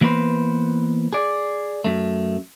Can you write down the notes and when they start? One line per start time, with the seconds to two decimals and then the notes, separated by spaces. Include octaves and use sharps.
0.01 E3 A#3 B3 B4 C5
1.13 G#4 D5
1.84 F#2 A3